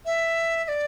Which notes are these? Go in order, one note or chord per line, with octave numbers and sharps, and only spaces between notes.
E5
E5
D5